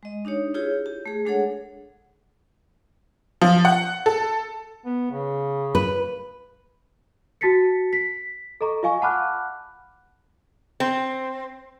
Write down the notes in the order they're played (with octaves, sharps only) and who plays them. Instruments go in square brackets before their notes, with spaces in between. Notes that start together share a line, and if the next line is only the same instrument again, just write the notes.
[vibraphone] G#3 D#5
D4 D#4 G4 C#5
E4 F4 G4 G#4 C#5
G4
A3 G#4
G#3 D4 G#4 A4 C#5 F#5
[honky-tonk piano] F3
F#5
A4
[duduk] B3
C#3
[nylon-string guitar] B4
[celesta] F#4 A5 A6 B6 C#7
B6
A4 D#5 A#5 C#6
F4 D#5 F5 G#5 C#6
F#5 A5 B5 D6 F6 F#6
[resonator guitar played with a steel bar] C4